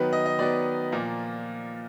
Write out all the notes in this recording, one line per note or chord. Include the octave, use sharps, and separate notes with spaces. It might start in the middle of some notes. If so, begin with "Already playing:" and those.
Already playing: D#3 F#3 B3 B4
D#5
D#5
D#3 F#3 B3 D5
A#2 F3 A#3